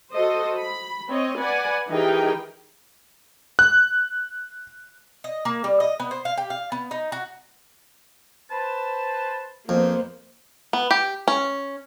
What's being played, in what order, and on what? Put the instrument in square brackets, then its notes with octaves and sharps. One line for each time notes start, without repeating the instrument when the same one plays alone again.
[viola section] F#4 A4 C5 D#5
B5
C4 C#5 D#5
B4 D5 F#5 G#5
E3 D#4 G4 G#4 A#4 G5
[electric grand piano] F#6
[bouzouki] D#5
A#3
G3
D#5
B3
C5
F5
G4
F5
B3
D#4
F#4
[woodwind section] B4 C5 A5
[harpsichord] F2 [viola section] A#3 B3 C5
[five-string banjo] B3
G4
C#4